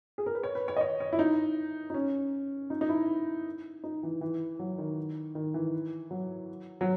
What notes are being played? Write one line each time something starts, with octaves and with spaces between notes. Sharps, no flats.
G#4
A#4
B4
C#5
B4
C#5
D#5
C#5
C#5
E4
D#4
D#4
C#4
D#4
D#4
E4
D#4
E3
E3
F#3
D#3
D#3
E3
F#3
F#3